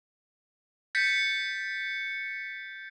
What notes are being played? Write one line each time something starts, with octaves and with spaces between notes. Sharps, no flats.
G6 A6 B6 C#7